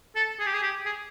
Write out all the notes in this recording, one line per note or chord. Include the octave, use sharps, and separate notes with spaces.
A4
G#4
G4
G#4
G4
G#4